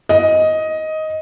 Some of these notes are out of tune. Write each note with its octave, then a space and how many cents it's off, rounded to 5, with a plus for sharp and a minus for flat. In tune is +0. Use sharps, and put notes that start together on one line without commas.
D#5 +10